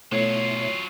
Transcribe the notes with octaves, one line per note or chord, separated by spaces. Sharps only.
B2 F#3 A3 E4 F4 C#5